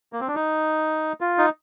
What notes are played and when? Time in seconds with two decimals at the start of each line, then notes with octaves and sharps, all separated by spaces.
0.13 A#3
0.20 C4
0.28 D4
0.35 D#4
1.21 F4
1.38 D#4